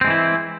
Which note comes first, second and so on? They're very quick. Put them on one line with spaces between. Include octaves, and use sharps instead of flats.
C4 G#3 E3 E4